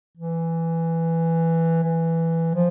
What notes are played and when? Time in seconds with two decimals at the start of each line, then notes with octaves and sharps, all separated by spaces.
0.17 E3
1.83 E3
2.55 F3